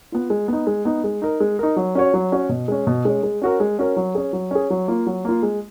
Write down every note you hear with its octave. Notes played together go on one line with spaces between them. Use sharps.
B3 F4
G#3
B3 D#4
G#3
B3 D#4
G#3
D#4 A#4
G#3
D#4 A#4
F#3
C#4 F#4 C#5
F#3
C#4 F#4 C#5
B2
G#3 C#4
B2
G#3 C#4
G#3
C#4 F#4 A#4
G#3
C#4 F#4 A#4
F#3
C#4 G#4
F#3
C#4 G#4
F#3
A#3 F4
F#3
A#3 F4
G#3